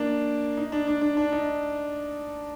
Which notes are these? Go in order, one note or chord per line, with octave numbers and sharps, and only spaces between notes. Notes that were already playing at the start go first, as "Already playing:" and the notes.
Already playing: A#3 D4
D#4
D4
D4
D4
D4
D#4